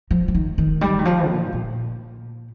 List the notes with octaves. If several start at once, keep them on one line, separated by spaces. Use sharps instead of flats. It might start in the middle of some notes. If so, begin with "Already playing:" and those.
F3
F3
D#3
D#3
G3
D#3
F3
A#2
A#2